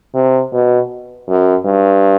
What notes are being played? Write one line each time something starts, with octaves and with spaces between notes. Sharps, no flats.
C3
B2
F#2
G2